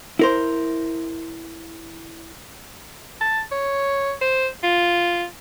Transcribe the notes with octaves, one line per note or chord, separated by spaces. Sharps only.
E4 A#4 C5
A5
C#5
C5
F4